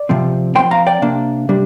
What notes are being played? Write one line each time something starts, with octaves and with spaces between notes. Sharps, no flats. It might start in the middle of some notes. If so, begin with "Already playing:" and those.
Already playing: D5
C3 F3 C4
F3 C4 G5 C6
F5 A#5
D5 G5
C3 A#3 D4
C3 G3 D4